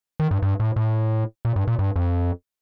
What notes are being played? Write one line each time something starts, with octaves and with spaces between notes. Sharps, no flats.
D#3
G2
G2
A2
A2
A#2
G2
A#2
G2
F2